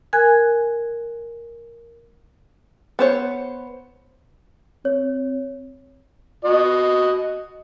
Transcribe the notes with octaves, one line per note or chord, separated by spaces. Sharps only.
A#4 G#5 F#6 G#6
B3 C5 C#5
C4 C#5
F#4 D#5